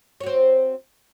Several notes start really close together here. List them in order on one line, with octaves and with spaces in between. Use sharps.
C#5 F#4 C4